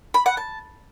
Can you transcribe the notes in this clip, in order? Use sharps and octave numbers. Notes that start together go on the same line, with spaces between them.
B5
F#5
A5